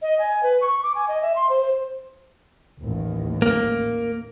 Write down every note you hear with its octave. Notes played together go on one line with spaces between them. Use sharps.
D#5
G#5
B4
C#6
D6
G#5
D#5
E5
C6
C5
C5
A1 D#2
A#3